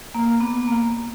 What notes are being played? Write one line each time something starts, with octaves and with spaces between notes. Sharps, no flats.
A#3
B3
A#3